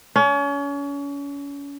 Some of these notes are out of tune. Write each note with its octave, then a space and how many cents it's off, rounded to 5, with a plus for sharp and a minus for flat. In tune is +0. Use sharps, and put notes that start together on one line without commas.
C#4 +35